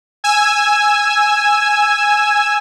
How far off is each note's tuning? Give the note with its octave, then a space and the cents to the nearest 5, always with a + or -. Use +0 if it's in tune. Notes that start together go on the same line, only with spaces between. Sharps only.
G#5 +0 E6 +0